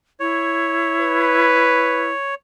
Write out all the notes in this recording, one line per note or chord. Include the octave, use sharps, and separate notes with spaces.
E4 C#5
B4